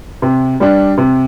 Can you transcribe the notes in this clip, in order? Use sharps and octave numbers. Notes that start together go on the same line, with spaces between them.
C3
G3 D4
C3